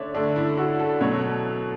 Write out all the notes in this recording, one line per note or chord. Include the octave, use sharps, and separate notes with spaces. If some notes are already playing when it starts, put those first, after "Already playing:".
Already playing: D3 A3 C#5 D5 E5
D3 A3 D4
E4
F#4
A4
B2 F#3 A3 C#5